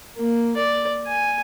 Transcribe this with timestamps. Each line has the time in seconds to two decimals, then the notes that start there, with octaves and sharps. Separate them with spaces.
0.17 A#3
0.57 D5
1.07 G#5